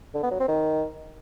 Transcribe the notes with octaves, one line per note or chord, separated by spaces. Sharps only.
D3
B3
F#3
C4
D#3